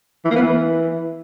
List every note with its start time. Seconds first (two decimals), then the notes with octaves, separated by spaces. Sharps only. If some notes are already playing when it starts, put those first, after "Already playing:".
0.25 E3
0.30 A#3
0.36 B3
0.41 E3